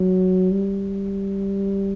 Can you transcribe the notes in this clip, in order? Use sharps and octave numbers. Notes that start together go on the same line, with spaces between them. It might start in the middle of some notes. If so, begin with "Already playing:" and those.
Already playing: F#3
G3